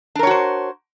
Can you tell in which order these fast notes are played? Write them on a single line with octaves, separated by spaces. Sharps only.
D4 A#4 C#5 F#4 C5